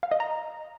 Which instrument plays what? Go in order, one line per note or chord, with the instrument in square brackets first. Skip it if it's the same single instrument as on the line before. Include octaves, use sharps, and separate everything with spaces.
[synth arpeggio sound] F5
D#5
A#5